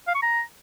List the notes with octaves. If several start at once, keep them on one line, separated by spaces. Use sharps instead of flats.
F5
C#6
A#5